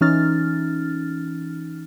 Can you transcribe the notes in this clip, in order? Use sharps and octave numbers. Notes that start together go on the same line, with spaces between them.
E3 C#4 D#4 F6 A6